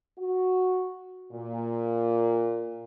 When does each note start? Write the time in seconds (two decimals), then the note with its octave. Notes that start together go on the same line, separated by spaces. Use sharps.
0.18 F#4
1.32 A#2